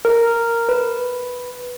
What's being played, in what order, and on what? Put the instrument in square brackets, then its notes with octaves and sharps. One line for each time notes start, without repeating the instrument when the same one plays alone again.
[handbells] A#4
B4